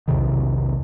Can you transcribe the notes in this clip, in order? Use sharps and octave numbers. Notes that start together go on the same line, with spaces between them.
B1 E2 C3 D#3